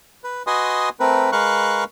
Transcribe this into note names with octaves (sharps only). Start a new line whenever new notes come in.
B4
F#4 B4 D#5 G#5 C6 D#6
A3 C4 A#4 B4
G#3 A#4 B4 F5 C#6 F#6